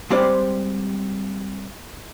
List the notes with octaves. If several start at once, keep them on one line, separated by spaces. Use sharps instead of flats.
G3 G#3 C4 G4 C5 D5